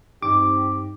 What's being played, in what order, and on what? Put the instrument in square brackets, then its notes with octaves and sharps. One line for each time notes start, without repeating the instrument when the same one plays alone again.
[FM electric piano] G2 D#4 [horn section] C4 G4 [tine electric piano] D6